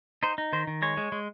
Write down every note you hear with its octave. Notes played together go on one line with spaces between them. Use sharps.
D#4 C5
D#4
D#3 C5
D#3
G#3 C#5
G#3
G#3